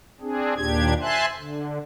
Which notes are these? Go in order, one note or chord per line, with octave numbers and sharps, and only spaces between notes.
C4 D4 G#4
D#2 A#2 D4 G4 G#6
C5 E5 G#5 A5 C6 F#6
D3